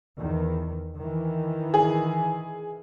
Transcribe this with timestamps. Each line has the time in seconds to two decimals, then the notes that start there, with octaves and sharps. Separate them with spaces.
0.19 E2 D#3
0.97 D#3 E3
1.74 G#4